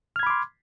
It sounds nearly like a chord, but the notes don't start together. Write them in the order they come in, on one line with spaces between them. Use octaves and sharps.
F6 G#6 B5 D6 C6